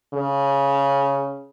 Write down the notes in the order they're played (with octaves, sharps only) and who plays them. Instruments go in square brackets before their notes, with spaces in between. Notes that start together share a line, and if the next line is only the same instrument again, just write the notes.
[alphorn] C#3